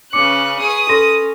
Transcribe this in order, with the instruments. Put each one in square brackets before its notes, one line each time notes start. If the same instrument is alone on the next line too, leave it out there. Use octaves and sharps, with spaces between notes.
[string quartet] C#3 C#4 [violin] B4 F#6 [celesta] D6 C#7
[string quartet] G#4 C#6 [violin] B4 D#6
[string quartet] C#4 [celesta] A4 C6 A#6